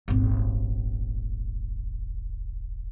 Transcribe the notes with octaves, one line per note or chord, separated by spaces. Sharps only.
D#1 G#1